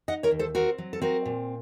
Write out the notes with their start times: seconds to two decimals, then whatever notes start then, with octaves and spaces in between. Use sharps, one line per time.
0.08 D#4 D#5 F#5
0.23 A#4 C#5
0.31 D#2
0.39 A4 C5
0.55 C4 F#4 A#4
0.78 F#3
0.93 A4
1.02 C4 F#4 A#4
1.25 A#2